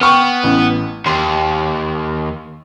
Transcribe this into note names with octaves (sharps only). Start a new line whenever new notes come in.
B3 G5 C#6 F6
A1
D#2 C6